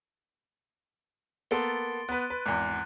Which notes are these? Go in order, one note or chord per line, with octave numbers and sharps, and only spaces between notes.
A#3 B3 A4 C6 D7 G7
A6
B3 B4 F#6 D#7
B4
G#1 E2 F#6